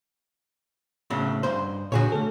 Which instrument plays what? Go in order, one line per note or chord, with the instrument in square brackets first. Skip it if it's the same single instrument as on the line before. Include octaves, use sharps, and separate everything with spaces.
[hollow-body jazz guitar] A2 C#3 F#3
G2 C5
[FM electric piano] A#2 D3 [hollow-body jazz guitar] F#4 G#4 C#5
[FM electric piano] A3 A4